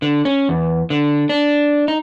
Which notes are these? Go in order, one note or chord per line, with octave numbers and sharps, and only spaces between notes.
D3
C#4
E2
D3
D4
D#4